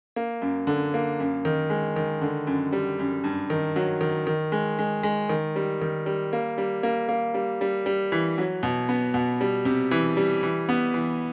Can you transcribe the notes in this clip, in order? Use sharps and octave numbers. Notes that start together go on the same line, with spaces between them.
A#3
F#2
D3
A#3
F#2
D#3
G#3
D#3
D3
F#2
G3
F#2
G2
D#3
F#3
D#3
D#3
G#3
G#3
G#3
D#3
G3
D#3
G3
A#3
G3
A#3
A#3
G3
G3
G3
E3
F#3
B2
B3
B2
G3
C3
E3
G3
E3
B3
E3